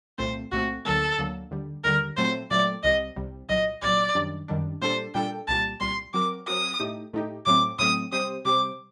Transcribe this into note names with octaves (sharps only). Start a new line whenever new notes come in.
C2 A#2 A3 C4 C5
C2 A#2 A3 C4 F#4
D2 D3 F#3 A#3 A4
D2 D3 F#3 A#3
D#2 D3 G3
D#2 D3 G3 A#4
A#2 F#3 A3 C4 C5
A#2 F#3 A3 C4 D5
C2 C3 G3 D#5
C2 C3 G3
C2 A#2 F#3 D#5
C2 A#2 F#3 D5
F#2 D#3 G3 D4
F#2 D#3 G3 D4
A#2 G3 D4 A4 C5
A#2 G3 D4 A4 G5
C2 A#2 G3 A5
C2 A#2 G3 C6
F#3 C4 F#4 A#4 D6
F#3 C4 F#4 A#4 D#6
A2 A3 D#4 G4
A2 A3 D#4 G4
A2 F#3 A3 C4 D6
A2 F#3 A3 C4 D#6
C3 G3 C4 G4 C5 D#6
C3 G3 C4 G4 C5 D6